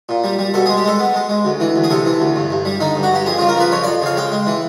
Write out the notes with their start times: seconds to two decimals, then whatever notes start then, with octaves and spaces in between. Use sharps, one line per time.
0.09 A#2
0.24 G3
0.39 G3
0.54 B2 A4
0.66 G#3 G#4
0.77 G4
0.84 G#3 A4
0.99 B3
1.14 G#3
1.29 G#3
1.45 D2
1.60 E3
1.76 D2
1.84 G#4
1.90 C3 A4
2.05 E3
2.20 D2
2.36 G2
2.50 G2
2.65 G3
2.80 D3 D#4
2.95 G2
3.03 F#4
3.12 G2 G4
3.26 F2 G#4
3.38 C#3 F4
3.49 A#4
3.56 F3 B4
3.71 F2 C#5
3.83 F2 D5
4.02 C#3 F5
4.17 G#3 G5
4.32 G#3
4.47 E3